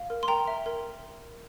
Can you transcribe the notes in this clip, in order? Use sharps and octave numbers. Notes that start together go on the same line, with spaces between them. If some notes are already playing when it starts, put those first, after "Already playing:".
Already playing: F5
A#4
C6
A#4 G5 A#5
E5
A#4